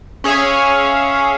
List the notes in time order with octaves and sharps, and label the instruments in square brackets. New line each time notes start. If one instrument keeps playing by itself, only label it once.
[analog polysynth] C#4 G#4 C#5 E5 F5